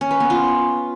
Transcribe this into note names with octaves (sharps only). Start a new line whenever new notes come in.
C#4
B4
B3
F4